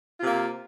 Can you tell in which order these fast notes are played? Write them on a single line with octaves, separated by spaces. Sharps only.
F4 C3 A#3